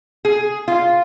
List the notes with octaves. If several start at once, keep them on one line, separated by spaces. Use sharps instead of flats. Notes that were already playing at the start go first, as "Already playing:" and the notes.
G#4
F4